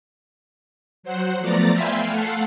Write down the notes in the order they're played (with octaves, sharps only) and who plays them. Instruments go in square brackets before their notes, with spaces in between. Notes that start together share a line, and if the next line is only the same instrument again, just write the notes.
[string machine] F#3 C5 F#5
F3 A3 B3 D5 A#5 A6
E5 F5 G5 G#5 B5 C6
A3 A4 F5 F#5 C7